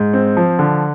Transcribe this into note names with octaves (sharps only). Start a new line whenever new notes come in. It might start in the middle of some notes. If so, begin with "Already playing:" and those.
Already playing: G#2
C4
F3
D3